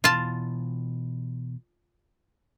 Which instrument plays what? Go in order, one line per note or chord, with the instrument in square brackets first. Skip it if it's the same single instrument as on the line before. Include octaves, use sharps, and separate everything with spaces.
[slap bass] B2 E3 [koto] F4 A5